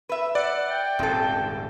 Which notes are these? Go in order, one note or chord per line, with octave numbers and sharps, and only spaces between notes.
B4 E5
D5 F#5
G5
D#1 G#2 C#3 C4 A4